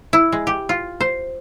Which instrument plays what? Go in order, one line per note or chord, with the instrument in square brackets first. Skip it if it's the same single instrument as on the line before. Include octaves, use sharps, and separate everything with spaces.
[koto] E4
G#3
G4
F4
C5